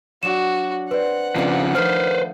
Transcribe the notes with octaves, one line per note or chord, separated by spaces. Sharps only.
F#3 D4 F#4 E7
C4 B4 D5 F#5
C#3 F3 B3 C4 D4
D#3 F3 A3 B4 C5 F6